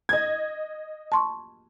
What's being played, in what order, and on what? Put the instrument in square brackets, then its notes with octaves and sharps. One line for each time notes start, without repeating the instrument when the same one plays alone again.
[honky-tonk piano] D#5 G#6
[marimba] A5 C6 C#6